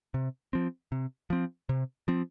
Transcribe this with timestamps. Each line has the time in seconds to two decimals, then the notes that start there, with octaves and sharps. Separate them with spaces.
0.14 C3
0.53 F3 C4
0.92 C3
1.30 F3 C4
1.69 C3
2.08 F3 C4